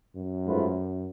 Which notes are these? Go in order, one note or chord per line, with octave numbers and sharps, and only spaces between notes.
F#2
G#2 F3 A3 F4 B4